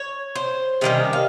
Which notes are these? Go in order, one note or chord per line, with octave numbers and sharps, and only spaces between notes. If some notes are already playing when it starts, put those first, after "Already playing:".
Already playing: C#5
C5
C3 D#3 G3 C#4 D#5
F5